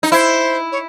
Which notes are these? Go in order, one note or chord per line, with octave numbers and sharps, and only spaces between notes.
D#4
E4 C5
C#5